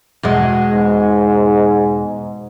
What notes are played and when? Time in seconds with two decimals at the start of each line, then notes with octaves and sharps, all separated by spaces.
0.23 E2 B2 G#3
0.71 G#2